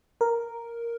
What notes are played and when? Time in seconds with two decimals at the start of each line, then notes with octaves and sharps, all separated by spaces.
0.21 A#4